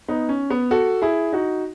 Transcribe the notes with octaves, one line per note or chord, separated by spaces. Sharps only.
B3 D#4
C#4
B3
F#4 A4
E4 G#4
D#4 F#4